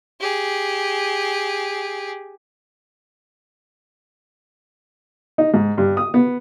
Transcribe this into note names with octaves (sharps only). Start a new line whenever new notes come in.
G4 G#4
D#4
G#2
G2
D#6
B3